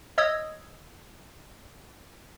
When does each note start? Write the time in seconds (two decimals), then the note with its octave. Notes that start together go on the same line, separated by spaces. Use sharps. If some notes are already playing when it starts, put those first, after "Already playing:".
0.18 C#5 D#5 D#6 E6 G#6 A#6